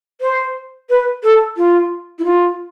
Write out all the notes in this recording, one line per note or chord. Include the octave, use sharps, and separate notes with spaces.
C5
B4
A4
F4
E4
F4